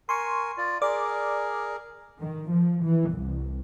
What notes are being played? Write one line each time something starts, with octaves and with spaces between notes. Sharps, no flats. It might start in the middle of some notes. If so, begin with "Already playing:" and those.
A#4 G#5 C6 C#6
F4 D5
G#4 A#4 D5 D6
D#3
F3
E3
C2